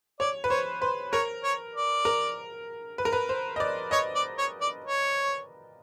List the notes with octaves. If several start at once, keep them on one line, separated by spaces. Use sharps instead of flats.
C#5 D5
B4
C5 C#5
B4 C5
A#4 C#5
C#5
D5
A#4
B4
A#4
B4
C5
D#5
D5
C#5 D#5
D5
C#5
D5
C#5